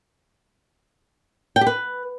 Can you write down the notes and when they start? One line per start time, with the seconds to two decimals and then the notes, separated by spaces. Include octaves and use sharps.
1.56 G5
1.61 G4
1.67 B4